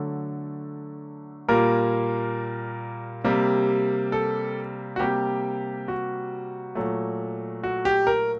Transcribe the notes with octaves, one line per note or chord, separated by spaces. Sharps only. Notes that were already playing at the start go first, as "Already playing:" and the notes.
Already playing: D3 F#3 A3
A#2 G3 A#3 A#4
C3 G3 A#3
A4
F#4
C3 G3 A#3 G4
F#4
A#2 F#3 A3
F#4
G4
A#4